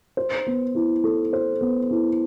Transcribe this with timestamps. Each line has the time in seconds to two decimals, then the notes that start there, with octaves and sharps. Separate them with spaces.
0.17 C5
0.47 B3
0.75 E4
1.04 A4
1.33 C5
1.61 B3
1.91 E4